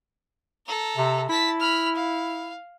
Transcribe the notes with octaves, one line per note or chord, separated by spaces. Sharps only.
A4 A#5
C3
E4 A5 B6
B5 F6
F5